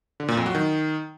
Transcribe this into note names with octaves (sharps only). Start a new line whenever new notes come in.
D3
A#2
F2
F#3
D#3